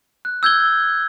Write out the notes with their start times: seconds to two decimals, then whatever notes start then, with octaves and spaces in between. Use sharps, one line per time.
0.25 F#6
0.43 E6 G6 G#6 G7